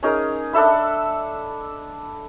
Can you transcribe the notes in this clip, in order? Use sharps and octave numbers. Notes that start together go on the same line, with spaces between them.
C#4 D#4 G#4 A#4
D4 A4 E5 B5